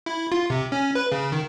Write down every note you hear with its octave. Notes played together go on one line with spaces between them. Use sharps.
E4
F4
C3
C#4
B4
C#3
D#3